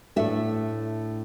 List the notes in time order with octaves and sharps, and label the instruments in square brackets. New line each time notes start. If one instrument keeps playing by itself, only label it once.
[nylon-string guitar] A2 A3 D4 E5